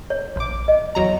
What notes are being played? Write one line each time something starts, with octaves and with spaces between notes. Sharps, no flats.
C#5
A#1 D6
D#5
E2 F#3 A#5